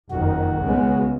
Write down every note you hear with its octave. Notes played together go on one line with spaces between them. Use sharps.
F#1 F2 D#3 F#4
C#2 C#3 G#3 B3